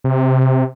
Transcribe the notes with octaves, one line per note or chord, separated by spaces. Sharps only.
C3